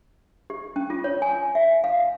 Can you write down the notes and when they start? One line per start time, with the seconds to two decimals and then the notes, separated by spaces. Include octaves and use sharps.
0.50 G4
0.76 C#4
0.90 F4
1.04 C#5
1.22 G#5
1.55 E5
1.84 F5